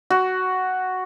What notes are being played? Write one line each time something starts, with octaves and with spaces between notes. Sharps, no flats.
F#4